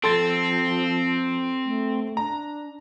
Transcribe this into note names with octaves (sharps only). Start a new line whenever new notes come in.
F3 C4 A4 C6 A6
A3
D4 A#5